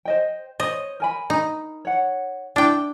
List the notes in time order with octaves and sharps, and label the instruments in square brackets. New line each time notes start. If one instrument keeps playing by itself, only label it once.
[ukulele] C5 D#5 G5
[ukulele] C5 C#5 [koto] D#5
[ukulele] A#4 G#5 B5
[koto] D#4
[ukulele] C#5 F#5
[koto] D4 G5 [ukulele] E4